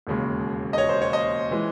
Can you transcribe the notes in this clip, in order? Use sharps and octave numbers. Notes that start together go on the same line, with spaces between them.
E1 D#2 C#3 G#3
D#5
C#5
C5
C#5
D#5
E3 G#3